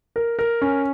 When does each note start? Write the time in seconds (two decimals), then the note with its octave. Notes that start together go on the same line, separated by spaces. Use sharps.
0.16 A#4
0.39 A#4
0.62 C#4